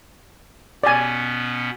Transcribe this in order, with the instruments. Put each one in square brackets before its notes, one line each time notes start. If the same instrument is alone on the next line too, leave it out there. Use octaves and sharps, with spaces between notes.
[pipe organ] B2 B3 C#4 [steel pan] D5 G#5